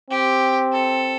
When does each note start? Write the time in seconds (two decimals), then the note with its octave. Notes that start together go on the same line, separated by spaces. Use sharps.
0.10 C4 G4
0.72 A4